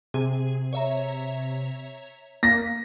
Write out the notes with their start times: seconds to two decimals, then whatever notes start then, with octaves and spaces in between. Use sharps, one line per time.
0.14 C3 G#4
0.73 C#5 E5 A#5
2.43 A#3 A#6 B6